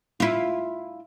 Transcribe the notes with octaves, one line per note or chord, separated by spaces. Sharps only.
E4 F4